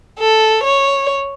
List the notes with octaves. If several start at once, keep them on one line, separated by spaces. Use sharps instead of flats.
A4
C#5